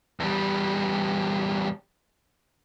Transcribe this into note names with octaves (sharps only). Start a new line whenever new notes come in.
E2 G3